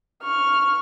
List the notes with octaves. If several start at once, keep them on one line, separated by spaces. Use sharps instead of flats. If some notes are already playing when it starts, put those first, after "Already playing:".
C#6 F6